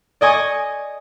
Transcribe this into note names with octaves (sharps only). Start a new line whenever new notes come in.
D5 D#5 G#5 C#6 D#6